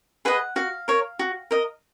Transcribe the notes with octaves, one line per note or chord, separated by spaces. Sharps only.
G#4 B4 D#5 F#5
F#4 F5
A#4 C#5
F#4
A#4 D#5